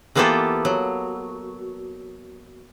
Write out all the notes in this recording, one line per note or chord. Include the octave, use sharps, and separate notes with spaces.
E3 A#3 B3 F4 G4 A4
F#3